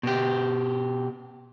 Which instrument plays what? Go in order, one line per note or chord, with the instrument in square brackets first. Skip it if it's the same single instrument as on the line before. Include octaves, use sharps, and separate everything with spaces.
[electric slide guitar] B2 G4